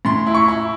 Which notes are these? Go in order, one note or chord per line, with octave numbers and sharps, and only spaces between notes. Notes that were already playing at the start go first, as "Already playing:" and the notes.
A2 C6
E4
C#6
E4